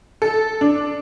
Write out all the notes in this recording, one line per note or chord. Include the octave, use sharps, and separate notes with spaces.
A4
D4